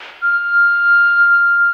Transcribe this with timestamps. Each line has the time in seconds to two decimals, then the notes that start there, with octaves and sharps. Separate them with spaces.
0.22 F6